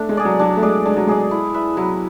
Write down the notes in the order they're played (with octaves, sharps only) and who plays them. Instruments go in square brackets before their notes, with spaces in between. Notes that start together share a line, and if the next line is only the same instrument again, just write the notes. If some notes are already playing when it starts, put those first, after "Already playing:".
Already playing: [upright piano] A3 [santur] D4
[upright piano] G#3
[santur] G#4 D5
[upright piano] F#3
[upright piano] F#3 [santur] D4
[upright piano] A3
[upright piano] G#3 [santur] G#4 D5
[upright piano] G#3 [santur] D4
[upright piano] F#3
[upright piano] G#3 [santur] G#4 D5
[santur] E4
B4 E5
[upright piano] F#3 [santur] E4